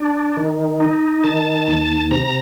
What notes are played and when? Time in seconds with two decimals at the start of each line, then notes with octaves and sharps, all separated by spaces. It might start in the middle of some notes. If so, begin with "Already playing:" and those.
Already playing: D4
0.37 D#3
0.80 D#4
1.24 D#3 A5
1.68 D#2
2.11 C3 A#5